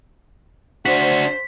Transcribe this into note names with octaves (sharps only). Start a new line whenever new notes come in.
D4 F#4 C5 B6